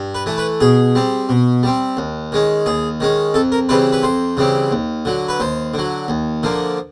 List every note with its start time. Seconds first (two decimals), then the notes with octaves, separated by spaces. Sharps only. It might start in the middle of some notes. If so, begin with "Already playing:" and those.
Already playing: G2
0.15 B4
0.26 E3 A3
0.38 B4
0.61 B2 G#4
0.95 G3 C4
1.29 B2
1.63 G3 C4
1.97 D#2
2.32 D#3 G#3 C#4
2.66 D#2 G#4
3.00 D#3 G#3 C#4
3.34 F2 A4
3.52 A#4
3.69 C#3 E3 G3 C4 B4
3.92 B4
4.03 F2 C5
4.37 C#3 E3 G3 C4
4.71 D#2
5.05 D3 F#3
5.29 B4
5.40 D#2 C5
5.74 D3 F#3
6.08 D#2
6.43 D3 F3 A#3